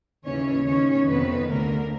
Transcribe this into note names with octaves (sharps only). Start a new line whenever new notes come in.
D#2 C#3 E3 C#4 C#5
D#2 D#3 C#4 C#5
F2 C3 D#3 B3 B4
D2 D3 A#3 A#4